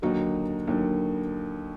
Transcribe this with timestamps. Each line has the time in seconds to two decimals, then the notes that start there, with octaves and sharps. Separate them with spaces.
0.02 D#2 D3 F#3 D#4 F#4
0.67 D#2 D3 F#3